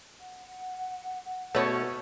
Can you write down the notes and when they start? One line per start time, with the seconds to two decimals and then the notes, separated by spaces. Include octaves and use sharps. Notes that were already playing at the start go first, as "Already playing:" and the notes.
0.20 F#5
1.55 B2 A3 C#4 C#5